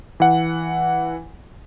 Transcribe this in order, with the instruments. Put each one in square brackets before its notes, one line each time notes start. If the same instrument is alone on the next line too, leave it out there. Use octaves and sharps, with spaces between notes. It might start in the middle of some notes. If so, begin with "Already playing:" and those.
[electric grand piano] E3 F#5